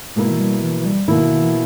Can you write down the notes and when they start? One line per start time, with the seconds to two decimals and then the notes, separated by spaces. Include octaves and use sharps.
0.16 B2 G#3 A#3 E4
0.31 E3
0.40 G3
0.63 E3
0.81 E3
0.86 G3
1.08 B2 D#3 A#3 E4
1.32 D#3
1.43 E3